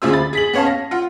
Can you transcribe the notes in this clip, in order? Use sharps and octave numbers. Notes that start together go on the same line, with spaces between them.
D2 C#3 F4 G#4 C5 E6
B5 A6
G#4 B6 F#7
B3 C#4 C#5 F5 A5
A#6
F4 F#5